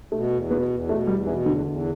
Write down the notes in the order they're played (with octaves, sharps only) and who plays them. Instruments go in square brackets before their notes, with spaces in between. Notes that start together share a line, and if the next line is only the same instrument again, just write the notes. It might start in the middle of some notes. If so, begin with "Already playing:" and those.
[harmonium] B2 [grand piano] A3
[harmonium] E2
[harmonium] B2 [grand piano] B3
[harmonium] E2
[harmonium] B2 [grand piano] A3
[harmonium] E2 [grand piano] G3
[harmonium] B2 [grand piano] E3
[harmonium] E2 [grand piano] D3
[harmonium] E2